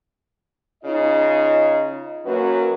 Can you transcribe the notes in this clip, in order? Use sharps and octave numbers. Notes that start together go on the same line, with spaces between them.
C#3 D#4 F4 D#5
F#2 F#3 A#3 F#4 B4